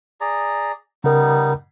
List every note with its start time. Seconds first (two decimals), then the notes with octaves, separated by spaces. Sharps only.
0.21 G#4 D5 A#5
1.04 C#3 G3 B3 D#4 A#4